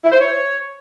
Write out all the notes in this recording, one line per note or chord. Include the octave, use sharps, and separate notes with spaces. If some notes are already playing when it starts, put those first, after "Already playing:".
E4
C5
C#5